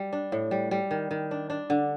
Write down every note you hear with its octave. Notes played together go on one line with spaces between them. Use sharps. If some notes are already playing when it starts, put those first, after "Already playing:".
Already playing: G3
D4
A2
G3
G3
D#3
D#3
D4
D4
D3